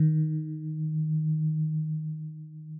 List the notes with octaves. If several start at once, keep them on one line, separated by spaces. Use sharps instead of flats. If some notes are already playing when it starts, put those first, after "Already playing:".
Already playing: D#3